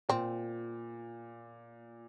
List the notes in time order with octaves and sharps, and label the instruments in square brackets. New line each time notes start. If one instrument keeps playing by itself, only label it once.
[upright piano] A#2 [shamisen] C4